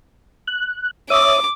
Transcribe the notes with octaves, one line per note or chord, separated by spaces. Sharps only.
F#6
C#5 E5 D6 D#6